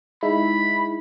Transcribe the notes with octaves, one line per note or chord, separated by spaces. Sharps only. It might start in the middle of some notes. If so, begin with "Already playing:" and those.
G#3 D#4 E4 B5